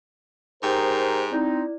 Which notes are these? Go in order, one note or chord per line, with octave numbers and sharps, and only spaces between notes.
G#2 G4 A#4 C5 G5 D#6
C4 D#4 E4 D5